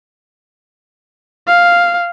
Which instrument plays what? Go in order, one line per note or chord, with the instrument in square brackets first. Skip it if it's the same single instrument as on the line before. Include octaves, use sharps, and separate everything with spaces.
[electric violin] F5